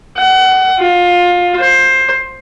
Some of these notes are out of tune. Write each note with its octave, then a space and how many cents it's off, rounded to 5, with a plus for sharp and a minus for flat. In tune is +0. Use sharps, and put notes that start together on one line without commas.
F#5 +30
F4 +20
C5 +15